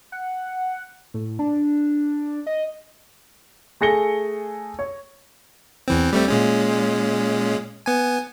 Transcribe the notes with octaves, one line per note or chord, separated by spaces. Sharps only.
F#5
A2
D4
D#5
A3 G#4 A#6 C#7 G7
C#5
E2 E3 C4
G3 A3 C4
A#2 G#3 C#4
B3 G#5